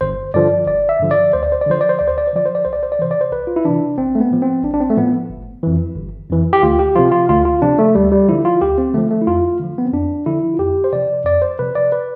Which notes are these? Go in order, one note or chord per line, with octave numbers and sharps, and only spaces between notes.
G1 C5
G2 D3 F3 D5
G1 D5
E5
G2 D3 F3
D5
D2 C5
D5
C5
D5
D3 F3 C5
D5
C5
D2 D5
C5
D5
C5
D3 F3 D5
C5
D5
C2 C5
D5
C5
D5
C3 E3 C5
D5
C5
C2 B4
F4
E4
C3 E3 D4
A1 C4
A3
B3
A2 F3
C4
A1 D4
D4
C4
A3
A2 F3 B3
G1
F2 E3
G1
F2 E3
G4
D2 F4
G4
C3 F3 F4
F4
D2 F4
F4
C3 F3 D4
A3
D2 G3
G3
D3 F3 E4
F4
D2 G4
C4
D3 F3 A3
A3
E4
F2 F4
D3 F3
B3
C4
F2 D4
D3 F3 E4
F4
F2 G4
C5
C3 F3 D5
F2 D5
C5
C3 F3 B4
D5
B4